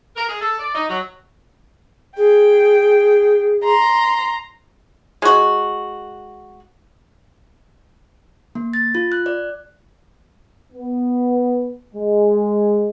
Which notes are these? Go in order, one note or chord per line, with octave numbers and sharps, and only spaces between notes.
A#4
G#4
A4
D5
D#4
F#3
G#4 G5
A#5 C6
G#3 F#4
A#3
A6
F4
F#6
D5
B3
G#3